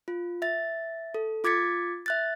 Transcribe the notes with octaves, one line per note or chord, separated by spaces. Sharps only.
F4
E5 A6
A4
F4 D6 G#6 A6 B6 C#7
E5 F#6 A6